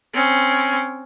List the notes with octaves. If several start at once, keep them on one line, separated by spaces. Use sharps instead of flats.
C4 C#4